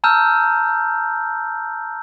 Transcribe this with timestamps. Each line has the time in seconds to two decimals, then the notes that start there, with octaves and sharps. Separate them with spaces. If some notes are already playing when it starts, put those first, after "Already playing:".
0.04 A5 A#5 E6 F6 G6